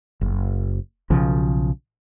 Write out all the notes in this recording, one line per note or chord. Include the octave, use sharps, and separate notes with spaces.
F#1
B1 C#3 F3